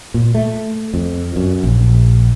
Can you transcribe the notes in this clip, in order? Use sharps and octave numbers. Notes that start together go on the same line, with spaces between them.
A#2
A3
F2
F#2
A#1